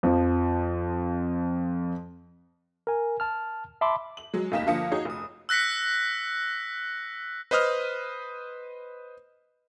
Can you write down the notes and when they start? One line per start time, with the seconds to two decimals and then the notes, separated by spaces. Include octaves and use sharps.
0.03 F2 F3
2.87 A#4 G#5
3.20 A5 F6
3.81 E5 A5 B5 C6 D6
4.17 F#7
4.34 F#3 G#3
4.52 F1 D#2 A#3 D#4 B6 E7
4.67 D3 F3 A#3 D#6 C#7
4.91 D#4 F#4 G#4 C#5
5.05 F1 D#6
5.49 E6 F#6 A#6 B6 C#7
7.51 B4 C5 D#5 D#6 F6